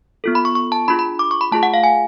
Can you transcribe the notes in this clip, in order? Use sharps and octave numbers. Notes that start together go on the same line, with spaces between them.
B3 F4 A4
B5
C#6
C#6
A5
D4 F4 G#4 B5
B5
D6
C#6
B5
A3 F4 G#4 A5
F#5
F5
G#5